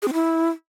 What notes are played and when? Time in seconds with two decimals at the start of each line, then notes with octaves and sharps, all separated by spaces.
0.02 G#4
0.08 C4
0.13 E4